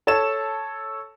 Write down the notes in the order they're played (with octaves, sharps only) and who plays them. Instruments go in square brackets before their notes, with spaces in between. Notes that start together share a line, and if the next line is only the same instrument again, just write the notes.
[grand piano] A4 C#5 A5 E6 E7